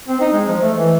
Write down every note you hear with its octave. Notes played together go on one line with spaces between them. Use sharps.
C4
D#4
G#3
F3
A3
E3